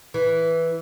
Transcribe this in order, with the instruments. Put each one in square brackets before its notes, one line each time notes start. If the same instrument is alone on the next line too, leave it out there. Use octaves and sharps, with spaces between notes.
[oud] E3